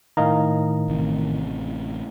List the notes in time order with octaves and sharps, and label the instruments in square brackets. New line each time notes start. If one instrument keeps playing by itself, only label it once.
[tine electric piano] A2 D#3 [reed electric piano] D#5 F5 A#5
[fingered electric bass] A1 C3